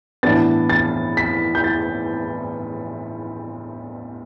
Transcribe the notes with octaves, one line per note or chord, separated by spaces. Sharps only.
A2 E3 B3 D4 A6
A6
B6
G6
A6